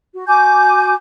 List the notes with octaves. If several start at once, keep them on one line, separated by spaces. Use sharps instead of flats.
F#4
F#4 G#5 D6 G6